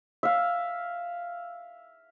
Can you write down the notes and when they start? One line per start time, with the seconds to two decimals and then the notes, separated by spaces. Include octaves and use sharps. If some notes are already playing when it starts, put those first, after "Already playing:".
0.23 E5 F5